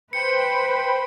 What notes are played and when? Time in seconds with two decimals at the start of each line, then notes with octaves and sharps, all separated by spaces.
0.13 B4 C5 G5 B5 C#7